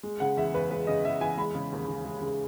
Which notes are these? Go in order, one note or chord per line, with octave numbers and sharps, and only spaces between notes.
G#3
C#3 F#5
E2 E5
E2 B4
G#3 B4
C#3 D#5
E2 E5
E2 G#5
G#3 B5
C#3
D#2
D#2
G#3
C#3